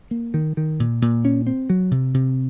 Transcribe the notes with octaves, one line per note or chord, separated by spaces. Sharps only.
A#3
D#3
D#3
A#2
A#2
C#4
C4
F#3
C3
C3